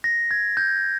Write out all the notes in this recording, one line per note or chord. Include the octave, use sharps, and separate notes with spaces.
A#6
G#6
G6